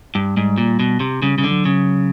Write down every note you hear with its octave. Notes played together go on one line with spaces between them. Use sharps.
G2
G#2 G3
A#2
B2
C3
C#3 G3
C#3 G3
D3
F#3
C#3